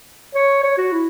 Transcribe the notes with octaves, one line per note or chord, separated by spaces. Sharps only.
C#5
C#5
F#4
E4